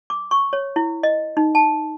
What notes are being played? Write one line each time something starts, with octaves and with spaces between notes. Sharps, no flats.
D6
C#6
C#5
E4
D#5
D#4
A5